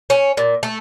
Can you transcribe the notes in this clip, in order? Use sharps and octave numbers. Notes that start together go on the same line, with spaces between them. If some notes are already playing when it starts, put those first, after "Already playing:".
C#4
A#2
A3